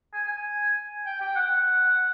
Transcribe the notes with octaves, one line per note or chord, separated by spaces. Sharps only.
G#5
G#5
G5
G5
F#5